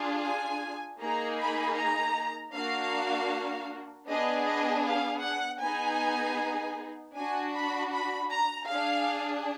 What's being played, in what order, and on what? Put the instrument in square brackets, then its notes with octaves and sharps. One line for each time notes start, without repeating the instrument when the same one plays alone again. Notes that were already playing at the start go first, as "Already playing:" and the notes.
Already playing: [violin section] D4 F4 G#4
G#5
A#3 D#4 G#4 A#5
B5
A#5
A#3 D4 F#4 F5
B3 D4 G#4 D#5
D#5
F5
F#5
B3 D#4 G#4 G#5
D4 F#4 G#5
B5
B5
A#5
D4 G#4 F5